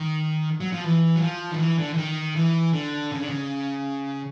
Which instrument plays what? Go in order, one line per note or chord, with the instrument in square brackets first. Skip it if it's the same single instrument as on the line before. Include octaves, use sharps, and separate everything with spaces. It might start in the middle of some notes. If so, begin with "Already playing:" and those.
Already playing: [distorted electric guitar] D#3
F#3
F3
E3
F#3
F3
D#3
E3
D3
E3
D#3
E3
D3
C#3
D3
C#3